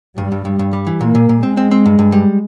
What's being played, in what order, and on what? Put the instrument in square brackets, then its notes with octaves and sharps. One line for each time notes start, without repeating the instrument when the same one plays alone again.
[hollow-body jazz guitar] G2 [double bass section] G3
[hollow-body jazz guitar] G2
G2
G2
G3
E3
[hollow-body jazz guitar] A#2 [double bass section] A#3
[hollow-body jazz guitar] A#2
A#2
[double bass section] G#3 [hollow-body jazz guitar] C4
[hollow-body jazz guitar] C4
C4
G2
G2
G3